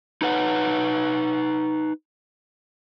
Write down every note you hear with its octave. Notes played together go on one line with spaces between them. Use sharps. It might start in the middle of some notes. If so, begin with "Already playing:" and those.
D#4 B4 F#5